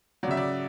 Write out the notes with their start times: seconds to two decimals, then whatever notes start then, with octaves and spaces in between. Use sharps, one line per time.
0.23 F#3 D5
0.28 C#3 E5
0.37 D5